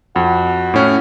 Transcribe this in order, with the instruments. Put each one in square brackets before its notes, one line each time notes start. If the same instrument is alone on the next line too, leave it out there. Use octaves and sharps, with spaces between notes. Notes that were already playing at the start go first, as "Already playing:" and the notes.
[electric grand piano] F2 [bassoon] F#4
[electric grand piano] A2 C#4